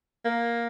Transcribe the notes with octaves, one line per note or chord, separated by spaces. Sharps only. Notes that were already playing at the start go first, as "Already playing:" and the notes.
A#3